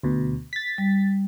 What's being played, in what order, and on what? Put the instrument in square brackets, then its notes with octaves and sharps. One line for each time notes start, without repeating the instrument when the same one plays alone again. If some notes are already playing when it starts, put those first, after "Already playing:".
[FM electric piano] D2 B2
A6 B6
[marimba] G3